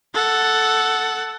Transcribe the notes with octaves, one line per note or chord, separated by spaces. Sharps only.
A4 F#5